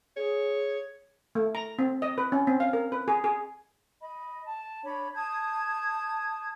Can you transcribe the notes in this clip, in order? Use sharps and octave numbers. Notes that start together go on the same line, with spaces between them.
G#4 C#5
A3
A#5
C4
D#5
B4
C#4
C4
F5
A#4
B4
G#4
G#4
D#5 B5
A5
D4 C#5 B5
A5 D#6 G6 G#6